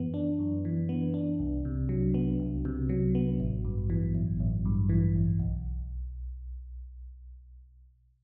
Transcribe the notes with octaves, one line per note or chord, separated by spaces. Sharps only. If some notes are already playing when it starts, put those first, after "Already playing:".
Already playing: F#2 E3 B3
D4
F#2
E3
B3
D4
C2
C3
F#3
B3
C2
C3
F#3
B3
A1
G2
E3
A1
A1
G2
E3
A1
B1